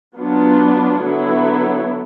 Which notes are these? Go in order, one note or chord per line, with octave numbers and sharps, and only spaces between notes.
F#3 B3 D4 F4
D3 F#3 B3 E4